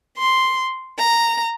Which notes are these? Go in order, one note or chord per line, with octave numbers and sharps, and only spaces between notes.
C6
A#5